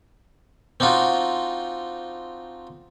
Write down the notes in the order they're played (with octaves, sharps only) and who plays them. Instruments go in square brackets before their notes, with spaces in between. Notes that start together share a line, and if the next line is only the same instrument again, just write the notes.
[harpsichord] C4 D4 D#4 F4 F#4